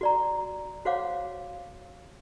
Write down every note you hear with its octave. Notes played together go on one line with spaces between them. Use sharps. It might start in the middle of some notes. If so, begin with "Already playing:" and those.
F#4 D5 A#5
F#4 C5 C#5 F5 F#5 D6